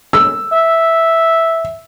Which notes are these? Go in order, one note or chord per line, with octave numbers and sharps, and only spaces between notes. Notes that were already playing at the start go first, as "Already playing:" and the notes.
E6
E5